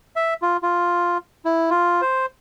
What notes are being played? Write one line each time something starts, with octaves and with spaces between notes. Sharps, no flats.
E5
F4
F4
E4
F4
C5